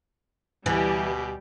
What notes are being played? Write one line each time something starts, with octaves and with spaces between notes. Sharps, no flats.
D2 B2 E3 G3 G4 G#5